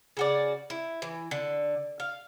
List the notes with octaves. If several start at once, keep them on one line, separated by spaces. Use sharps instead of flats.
C#3 F#4 D5
E4
E3
D3
F5